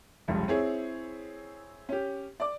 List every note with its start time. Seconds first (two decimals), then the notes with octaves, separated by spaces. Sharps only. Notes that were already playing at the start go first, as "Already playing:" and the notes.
0.28 F1 C#2 G2
0.48 C4 E4 G#4 C#5
1.89 C#4 G4
2.40 D5 D6